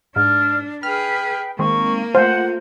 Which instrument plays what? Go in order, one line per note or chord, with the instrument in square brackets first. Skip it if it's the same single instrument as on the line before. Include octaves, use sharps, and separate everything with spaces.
[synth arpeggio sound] G#2 [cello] D4 [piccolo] F6
[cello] G#4 B4 [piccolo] G5 [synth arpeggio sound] F6
[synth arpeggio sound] D#3 G#3 C4 [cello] A#3 [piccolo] C#6
[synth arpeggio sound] A3 F4 [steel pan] C5 [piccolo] F#5